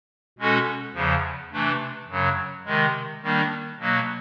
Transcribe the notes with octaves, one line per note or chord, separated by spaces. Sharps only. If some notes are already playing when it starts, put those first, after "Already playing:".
B2 G#3 C#4 F#4 A4
E2 C#3 F3
C3 E3 A3 D4
F#2 C#3 F#3
C3 D#3 G#3
D#3 G3 A#3 D4
B2 F#3 A#3